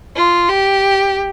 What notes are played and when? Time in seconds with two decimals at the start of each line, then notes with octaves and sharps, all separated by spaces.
0.16 F4
0.49 G4